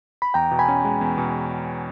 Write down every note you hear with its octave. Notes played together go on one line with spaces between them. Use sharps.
B5
E2 G5 A#5
B2
G#5 B5
C#4
G#3
E2
B2